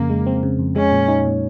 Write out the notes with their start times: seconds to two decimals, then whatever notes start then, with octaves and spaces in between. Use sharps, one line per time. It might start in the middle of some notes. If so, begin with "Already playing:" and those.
Already playing: F2 C#3 A#3
0.10 G#3
0.27 C4
0.43 C#3
0.59 F2
0.76 G#3 C#4
0.92 A#2
1.08 D#4
1.25 A#2